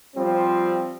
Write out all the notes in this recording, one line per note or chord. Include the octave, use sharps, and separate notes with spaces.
F3 G3 C4